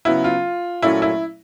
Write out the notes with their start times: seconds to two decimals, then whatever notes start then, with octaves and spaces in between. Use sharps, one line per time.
0.05 C#3 F#3 B3 E4
0.24 F4
0.82 A#2 F#3 A3 C#4 E4
1.02 E4